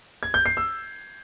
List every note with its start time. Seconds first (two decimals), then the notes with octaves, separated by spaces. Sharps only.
0.23 G#6
0.34 G6
0.46 C7
0.57 E6